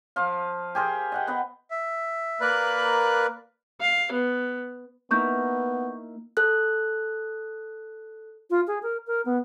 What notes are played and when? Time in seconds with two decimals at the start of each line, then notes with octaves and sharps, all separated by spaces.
0.16 F3 F5
0.75 G4 G#4 A#4 C5
1.12 D#5 F#5 G5
1.27 B3 B4 D#5
1.71 E5
2.41 A#3 A#4 B4 D5 B5 F#6
3.81 F5
4.12 B3
5.11 A#3 B3 D#4 E4 C#6 G6
6.37 A4 F#6
8.50 F4
8.67 G#4
8.82 A#4
9.07 A#4
9.25 B3